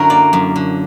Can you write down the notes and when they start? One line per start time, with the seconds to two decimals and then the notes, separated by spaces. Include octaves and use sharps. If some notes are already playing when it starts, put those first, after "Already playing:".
Already playing: F#2 D3 F#3 E4 F#4 A#4
0.10 A#3 D5
0.33 F#2
0.56 D3